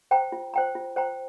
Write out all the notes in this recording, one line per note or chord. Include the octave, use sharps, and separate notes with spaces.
C5 G5 A#5
F4
C5 G5 A#5
F4
C5 G5 A#5